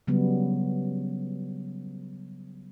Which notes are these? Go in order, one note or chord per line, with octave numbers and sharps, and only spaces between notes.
C#3 F#3 G3 B3